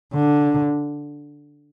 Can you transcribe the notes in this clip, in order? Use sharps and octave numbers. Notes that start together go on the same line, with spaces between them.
D3